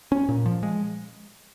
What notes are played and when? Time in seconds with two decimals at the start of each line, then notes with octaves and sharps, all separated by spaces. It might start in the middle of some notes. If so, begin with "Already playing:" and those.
0.12 C#4
0.29 A#2
0.46 F3
0.63 G#3